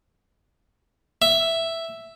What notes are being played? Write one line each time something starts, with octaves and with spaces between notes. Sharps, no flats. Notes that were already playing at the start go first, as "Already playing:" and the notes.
E5